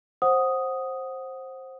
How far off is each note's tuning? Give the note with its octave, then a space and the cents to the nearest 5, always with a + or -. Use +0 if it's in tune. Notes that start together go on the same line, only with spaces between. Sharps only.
C5 +15 F#5 +0 D#6 +0